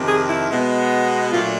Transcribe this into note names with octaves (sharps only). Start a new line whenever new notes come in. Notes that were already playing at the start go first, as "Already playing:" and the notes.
Already playing: F2 C3 D#3
G#4
E4
B2 G#3 B3
A#2 F#3 A3 D4 F4